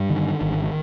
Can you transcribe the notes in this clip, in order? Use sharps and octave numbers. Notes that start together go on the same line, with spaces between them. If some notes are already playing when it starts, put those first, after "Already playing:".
Already playing: G2
D3 D#3
G#1